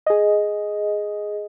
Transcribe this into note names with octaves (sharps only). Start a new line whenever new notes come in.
G#4 D#5